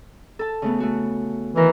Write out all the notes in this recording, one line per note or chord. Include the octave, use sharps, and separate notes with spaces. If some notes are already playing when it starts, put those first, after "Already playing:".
A4 A5
C#3 A3 B3
A3 F#4
D#3 E3 A#4